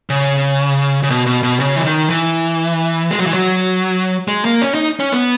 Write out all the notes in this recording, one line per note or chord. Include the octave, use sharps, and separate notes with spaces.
C#3
C#3
B2
B2
B2
C#3
E3
D#3
E3
G#3
F#3
E3
F#3
G#3
A#3
C#4
D#4
C#4
B3